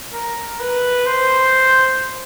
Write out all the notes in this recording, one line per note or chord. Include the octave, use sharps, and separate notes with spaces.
A#4
B4
C5